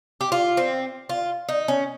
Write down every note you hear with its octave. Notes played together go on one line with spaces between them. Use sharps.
G4
F4
C4
F4
D#4
C#4